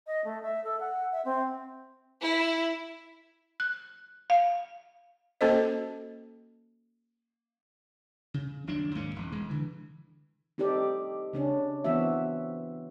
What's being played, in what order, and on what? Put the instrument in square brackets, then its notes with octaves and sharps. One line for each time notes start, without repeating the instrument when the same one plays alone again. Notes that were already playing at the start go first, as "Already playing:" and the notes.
[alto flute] D#5
A3
E5
A4
F#5
E5
C4
[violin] E4
[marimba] F#6
F5
[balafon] A#3 C#4 F#4 A4 C5 D#5
[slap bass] C#3
F#1 D#2 F#3 D4
D#2 G#2 A#3 C#4
E1
E1 G#3
D3 E3
[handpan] C4 D#4 G4 A4 D5
C#3 C#4 D4
E3 B3 C4 F#4 E5